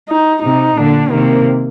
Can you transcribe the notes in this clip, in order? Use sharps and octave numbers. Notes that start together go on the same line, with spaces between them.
D#4
C3 D#4
A#2 D3 D4
C3 D#3 A#3